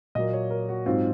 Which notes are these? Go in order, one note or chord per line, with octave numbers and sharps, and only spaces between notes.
A#2 F#3 A#3 D#5
C#5
A#4
F#4
G#2 F#3 C4 F4